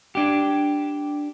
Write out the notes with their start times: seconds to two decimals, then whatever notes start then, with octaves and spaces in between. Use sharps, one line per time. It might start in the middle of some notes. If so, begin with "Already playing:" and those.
0.15 D4 G4